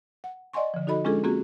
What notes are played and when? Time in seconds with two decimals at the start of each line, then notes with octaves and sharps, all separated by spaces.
0.24 F#5
0.54 D5 D#5 F#5 G#5 C6 C#6
0.74 D3 F3
0.87 D#4 F#4 A4 D#5 B5
1.05 G#3 C#4 D4 F4 G#4 A4
1.24 A#3 C4 C#4 F4 F#4 G#4